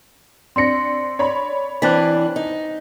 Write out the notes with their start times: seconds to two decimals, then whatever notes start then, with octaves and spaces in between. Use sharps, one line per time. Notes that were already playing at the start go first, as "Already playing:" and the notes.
0.56 C4 D4 C6 A#6 C#7
1.19 C#5 D5 B5
1.82 E3 C4 D4 F#6 A6 B6
2.36 D#4